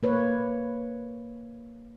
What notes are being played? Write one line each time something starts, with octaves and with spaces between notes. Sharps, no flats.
A#3 B4 C#5